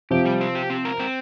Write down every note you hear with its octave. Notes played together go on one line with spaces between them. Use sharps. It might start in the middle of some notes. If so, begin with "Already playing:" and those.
C3 F3 G4
G3
C4
G4
C4
A#4
C4